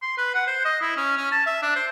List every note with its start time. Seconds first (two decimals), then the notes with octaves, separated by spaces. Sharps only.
0.02 C6
0.18 B4
0.35 F#5
0.47 C5
0.65 D#5
0.81 E4
0.97 C#4
1.17 C#4
1.32 A5
1.46 E5
1.63 D4
1.76 C5